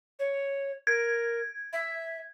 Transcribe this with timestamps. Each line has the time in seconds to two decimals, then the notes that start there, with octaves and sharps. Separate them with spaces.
0.19 C#5
0.87 A#4 G#6
1.73 E5